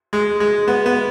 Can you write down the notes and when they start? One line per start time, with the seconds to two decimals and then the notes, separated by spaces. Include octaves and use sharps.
0.13 G#3
0.40 G#3
0.68 B3
0.86 B3